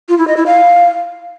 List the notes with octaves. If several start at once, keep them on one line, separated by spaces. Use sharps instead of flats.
F4
E4
D#5
E4
F5